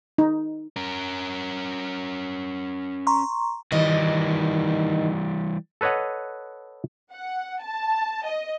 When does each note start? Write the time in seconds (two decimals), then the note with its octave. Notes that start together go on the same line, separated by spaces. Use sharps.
0.18 D#4
0.76 C#4 A#4
3.07 A#5 C6 C#6
3.72 D#3 E3 G3 D#5
5.81 A4 B4 C#5 D#5 F#5
7.13 F#5
7.63 A5
8.27 D#5